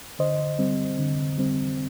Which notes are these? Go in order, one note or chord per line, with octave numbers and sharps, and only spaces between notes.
D3 C5 D#5
G3 C4
D3
G3 C4